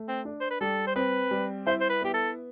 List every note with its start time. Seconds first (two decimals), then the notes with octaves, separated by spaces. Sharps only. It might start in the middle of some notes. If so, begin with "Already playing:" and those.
Already playing: A3
0.08 C4
0.25 D4
0.41 C5
0.50 B4
0.61 G3 A4
0.87 C5
0.96 C4 B4
1.31 G3
1.67 E4 C5
1.81 C5
1.89 B4
2.02 B3 G4
2.14 A4